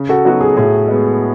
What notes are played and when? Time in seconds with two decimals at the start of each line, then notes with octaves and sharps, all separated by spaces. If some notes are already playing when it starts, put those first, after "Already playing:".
Already playing: C#3
0.09 F#4 A4
0.25 F#3 B3 D#4 F#4
0.41 G#4
0.57 A2 G#4
0.88 G#3 B3